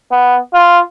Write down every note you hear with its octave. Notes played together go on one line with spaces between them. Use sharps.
B3
F4